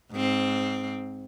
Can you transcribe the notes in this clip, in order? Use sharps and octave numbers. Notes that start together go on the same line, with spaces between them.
G#2 C4